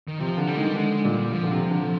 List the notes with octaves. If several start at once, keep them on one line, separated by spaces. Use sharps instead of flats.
D#3
C3 F3
D3
G3
D#3 G#3
G3
D3 G#3
A#2 G3
A#2 F3
D3
C3
D3